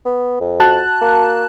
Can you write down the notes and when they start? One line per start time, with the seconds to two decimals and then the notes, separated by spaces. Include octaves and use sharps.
0.06 B3
0.40 F2
0.60 F#4 A5 F#6
1.01 A#3